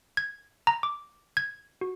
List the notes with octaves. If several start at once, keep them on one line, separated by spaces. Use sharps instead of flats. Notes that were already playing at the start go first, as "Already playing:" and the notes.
G#6
A#5
D6
G#6
F#4